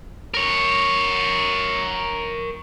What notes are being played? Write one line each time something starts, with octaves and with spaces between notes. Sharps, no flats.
A#4 C#5